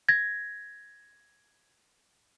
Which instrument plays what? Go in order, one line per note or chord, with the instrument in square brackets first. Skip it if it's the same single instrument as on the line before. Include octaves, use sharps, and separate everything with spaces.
[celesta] G#6 A#6